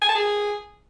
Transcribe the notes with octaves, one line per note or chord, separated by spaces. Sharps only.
G#5
A5
G#4